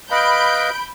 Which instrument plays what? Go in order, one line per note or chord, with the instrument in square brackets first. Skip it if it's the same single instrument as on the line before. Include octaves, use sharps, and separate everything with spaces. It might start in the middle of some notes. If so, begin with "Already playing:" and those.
[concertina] B4 D#5 F5 [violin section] B5 G6 D7